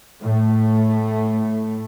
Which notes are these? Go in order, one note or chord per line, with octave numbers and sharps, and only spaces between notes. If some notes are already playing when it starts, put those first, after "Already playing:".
A2 A3